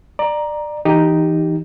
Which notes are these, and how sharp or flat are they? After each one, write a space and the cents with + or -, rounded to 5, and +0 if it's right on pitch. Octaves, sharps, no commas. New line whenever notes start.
D5 +25 A#5 +10
E3 +0 D#4 +0 G4 +0